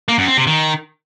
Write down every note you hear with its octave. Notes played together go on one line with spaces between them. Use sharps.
A#3
F#2
C4
C3
D#3